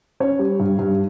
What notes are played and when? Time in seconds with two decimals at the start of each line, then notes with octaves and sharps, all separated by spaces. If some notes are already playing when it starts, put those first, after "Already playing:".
0.20 C#4 C#5
0.39 G3
0.60 G2
0.79 G2